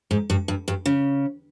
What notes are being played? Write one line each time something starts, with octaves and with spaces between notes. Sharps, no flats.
G#2
G2
G2
G2
C#3